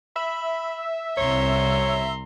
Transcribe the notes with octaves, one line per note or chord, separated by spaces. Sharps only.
E5 B5
C2 C#5 A#5 C6